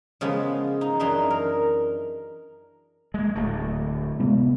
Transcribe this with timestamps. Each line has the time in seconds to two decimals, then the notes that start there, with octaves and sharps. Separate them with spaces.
0.21 C#3 F3 G#3 B3
0.81 D#4
1.00 F#2 E3 D4 D#4 A#5 C6
1.31 A#4
3.14 G#3 A#3
3.35 D1 D2 A3
4.20 C3 G#3 B3